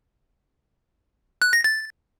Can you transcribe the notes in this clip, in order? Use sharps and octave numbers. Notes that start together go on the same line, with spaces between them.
F#6
A#6
A6